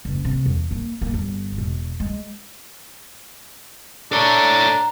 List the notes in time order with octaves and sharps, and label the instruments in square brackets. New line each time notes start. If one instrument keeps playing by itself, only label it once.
[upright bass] F#1
C3
E2
A#3
A#3
G1
E1
G#3
[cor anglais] D4 [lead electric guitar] A4 C#5 [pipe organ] A#5